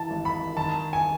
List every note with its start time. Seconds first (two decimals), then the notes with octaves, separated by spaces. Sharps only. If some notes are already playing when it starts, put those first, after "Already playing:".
Already playing: E3 A5
0.10 G#1
0.25 B5
0.57 D#3 A5
0.93 G#5